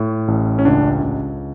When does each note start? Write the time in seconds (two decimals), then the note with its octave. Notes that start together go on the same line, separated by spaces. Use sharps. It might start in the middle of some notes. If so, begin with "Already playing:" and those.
Already playing: A2
0.28 A1
0.59 C#4
0.65 C#2 D4
1.03 C#2